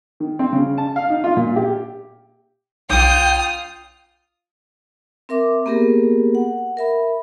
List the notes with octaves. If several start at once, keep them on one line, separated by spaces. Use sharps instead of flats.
D#3
C4
C#3
A5
F5
D#4
F4
A#2
G4
B1 F4 G5 D#6
C4 A#4 E5 D6
A#3 B3 G4 G#4 A#4
F#5
A#4 E5 B5